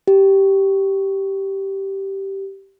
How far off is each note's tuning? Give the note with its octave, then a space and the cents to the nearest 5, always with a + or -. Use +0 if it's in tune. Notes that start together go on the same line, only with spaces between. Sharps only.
G4 -10